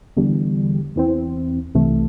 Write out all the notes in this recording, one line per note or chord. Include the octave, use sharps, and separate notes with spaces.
E2 D3 G3
E2 E3 C4
C2 C3 E3 A3